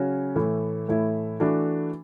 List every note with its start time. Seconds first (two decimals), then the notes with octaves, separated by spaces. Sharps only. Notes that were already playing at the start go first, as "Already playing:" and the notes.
Already playing: C#3 F#3 C#4 F#4
0.36 A2 E3 A3 E4
0.88 A2 E3 A3 E4
1.40 E3 A3 D4 F#4